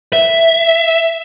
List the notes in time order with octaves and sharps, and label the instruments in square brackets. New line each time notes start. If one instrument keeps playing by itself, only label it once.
[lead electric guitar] E5